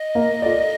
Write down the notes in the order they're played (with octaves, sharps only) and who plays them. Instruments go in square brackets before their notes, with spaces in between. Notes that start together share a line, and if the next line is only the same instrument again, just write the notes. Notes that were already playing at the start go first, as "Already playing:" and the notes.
Already playing: [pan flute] D#5
[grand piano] A#3
F4 A4 D5